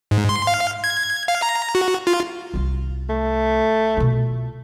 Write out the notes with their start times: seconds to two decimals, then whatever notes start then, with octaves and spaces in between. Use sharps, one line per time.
0.11 G#2
0.29 C6
0.47 F5
0.84 G#6
1.28 F5
1.42 A#5
1.75 F#4
2.07 F4
2.54 C2 F4
3.09 A3
3.97 B2 F4